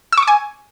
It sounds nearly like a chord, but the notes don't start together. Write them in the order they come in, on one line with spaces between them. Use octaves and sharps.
E6 C#6 D6 G#5